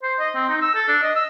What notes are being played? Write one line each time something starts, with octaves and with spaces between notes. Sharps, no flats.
C5
D#5
C4
D#4
E6
A4
D4
D#5
E6